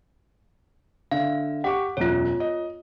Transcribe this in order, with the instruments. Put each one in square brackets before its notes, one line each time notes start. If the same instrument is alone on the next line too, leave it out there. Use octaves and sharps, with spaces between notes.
[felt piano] D3 E5 [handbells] F5
[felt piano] G4 C#6 D6 [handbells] F#5
[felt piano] E1 F#2 [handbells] F4 C#5
[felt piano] D#5